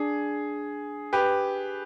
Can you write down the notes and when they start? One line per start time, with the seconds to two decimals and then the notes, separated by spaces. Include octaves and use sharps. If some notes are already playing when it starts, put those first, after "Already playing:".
Already playing: D4 G#4
1.13 G4 B4